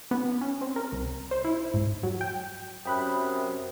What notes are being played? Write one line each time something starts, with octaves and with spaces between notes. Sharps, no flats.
B3
C#4
C4
A#4
C2
C5
E4
G#2
F#3
G5
F#2 C3 G5 B5 D#6 F#6